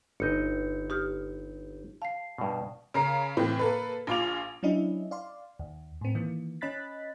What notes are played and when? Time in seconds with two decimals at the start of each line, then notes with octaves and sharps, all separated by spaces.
0.20 G1 D#4 D#5 G6 C#7
0.90 G4 D#6 F6
2.02 F5 A5 C7
2.38 G2 B2
2.94 C#3 A#4 C7
3.37 A2 E3 C4
3.59 A#3 A4 B4
4.07 A#1 F4 D6 F7
4.63 F#3 C#4 D4 E4 D#5 E5
5.11 D5 F5 C6
5.59 D#2
6.01 A2 C4
6.15 D#3 E3 A#3
6.61 C#4 D#5 B5 F#6 A6 B6